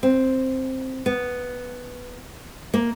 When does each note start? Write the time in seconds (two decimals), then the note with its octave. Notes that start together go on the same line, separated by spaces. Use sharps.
0.03 C4
1.06 B3
2.74 A#3